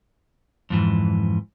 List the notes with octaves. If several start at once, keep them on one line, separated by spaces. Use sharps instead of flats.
F2 G#2 E3